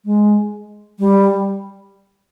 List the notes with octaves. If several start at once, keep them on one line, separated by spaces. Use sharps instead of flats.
G#3
G3